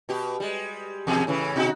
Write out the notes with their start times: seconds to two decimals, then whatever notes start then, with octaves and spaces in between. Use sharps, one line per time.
0.09 B2 G4
0.40 G3 G#3
1.07 E2 B2 G#4
1.27 A2 C#3 E3
1.56 B2 D#4 F#4